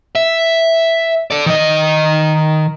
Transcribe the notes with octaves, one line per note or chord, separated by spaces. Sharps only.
E5
A4 D5
D#3 D#5